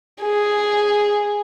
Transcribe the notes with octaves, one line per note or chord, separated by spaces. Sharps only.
G#4